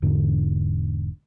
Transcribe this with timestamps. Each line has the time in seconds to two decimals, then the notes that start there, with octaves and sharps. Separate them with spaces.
0.02 E1 E2 G#2 D3